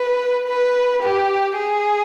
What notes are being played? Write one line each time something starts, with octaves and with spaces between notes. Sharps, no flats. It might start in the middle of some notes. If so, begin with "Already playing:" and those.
Already playing: B4
B4
G4
G#4